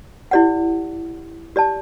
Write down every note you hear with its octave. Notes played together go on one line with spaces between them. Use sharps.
E4 G4 D5 F#5
G4 D5 A5